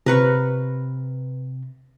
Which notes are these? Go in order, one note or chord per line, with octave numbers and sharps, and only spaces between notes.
C3 A#4 B4 C#6